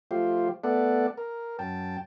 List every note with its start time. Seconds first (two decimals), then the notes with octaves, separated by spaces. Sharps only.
0.11 F3 A3 F4 G4 C5
0.64 A3 B3 A4 D5 F#5
1.17 A#4
1.59 F#2 G5 A5